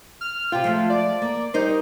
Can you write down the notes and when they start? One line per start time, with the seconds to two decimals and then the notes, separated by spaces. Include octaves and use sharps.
0.21 F6
0.52 C3 F4 G5
0.64 F3 G#3 A3
0.90 D5
1.22 A#3
1.54 G3 D#4 A#4 C5